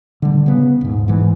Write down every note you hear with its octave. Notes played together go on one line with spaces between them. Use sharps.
D3 G3
C#3 B3
D#1 G#2
G#2 E3